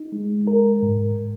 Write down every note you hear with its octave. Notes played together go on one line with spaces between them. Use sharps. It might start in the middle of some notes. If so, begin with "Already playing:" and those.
Already playing: D#4
G#3
A#4
G#2